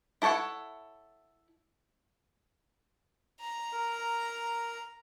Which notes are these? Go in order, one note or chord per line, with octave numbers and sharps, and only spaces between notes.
E4 A4 B4 C#5 F#5
A#5
A#4